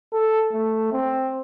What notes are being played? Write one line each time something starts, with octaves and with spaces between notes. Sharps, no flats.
A4
A3
C4